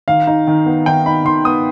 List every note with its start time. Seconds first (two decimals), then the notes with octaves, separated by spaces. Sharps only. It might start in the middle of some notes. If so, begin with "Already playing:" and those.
0.08 D#3 F5
0.27 D#4
0.47 D#3
0.66 B3
0.86 D#3 G5
1.06 D#4 B5
1.25 D#3 C6
1.45 B3 D#6